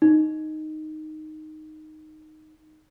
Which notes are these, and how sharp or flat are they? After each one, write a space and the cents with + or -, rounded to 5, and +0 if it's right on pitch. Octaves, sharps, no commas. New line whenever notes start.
D#4 -5